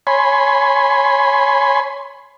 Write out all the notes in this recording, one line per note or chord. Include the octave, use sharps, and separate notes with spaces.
C#5 G#5 B5 C6